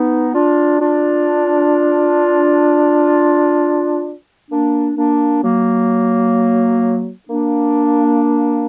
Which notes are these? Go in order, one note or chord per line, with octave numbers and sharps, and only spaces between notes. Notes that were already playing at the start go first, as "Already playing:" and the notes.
Already playing: B3 D#4
D4 F4
D4 F4
A#3 D4
A#3 D4
F#3 A#3
A#3 D4